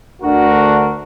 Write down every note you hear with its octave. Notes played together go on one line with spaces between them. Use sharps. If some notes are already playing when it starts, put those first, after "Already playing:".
D2 D4 F#4 A#4